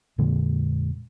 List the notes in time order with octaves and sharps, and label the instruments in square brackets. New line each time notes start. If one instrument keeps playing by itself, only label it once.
[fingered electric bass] F2 A#2 D3 G#3